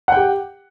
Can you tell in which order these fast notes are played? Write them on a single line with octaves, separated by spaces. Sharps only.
F#5 G5 G4